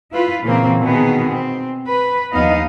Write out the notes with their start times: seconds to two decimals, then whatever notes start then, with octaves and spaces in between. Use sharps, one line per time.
0.12 E4 F4 B4
0.44 A#2 C#3 E3 A#3 C4
0.81 B2 D#3 B3 G#4
1.28 C4
1.87 B4
2.32 D#2 F3 B3 D#4 D#5 F5